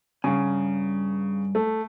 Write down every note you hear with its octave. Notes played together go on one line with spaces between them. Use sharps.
G2 C#3 G#5
A3